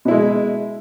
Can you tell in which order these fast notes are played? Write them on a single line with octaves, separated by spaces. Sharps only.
B2 E4 G#3